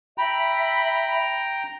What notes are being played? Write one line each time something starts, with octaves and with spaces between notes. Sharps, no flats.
E5 G5 A#5 B5